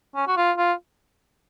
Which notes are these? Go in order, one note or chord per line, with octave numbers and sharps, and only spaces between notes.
C#4
F#4
F4
F4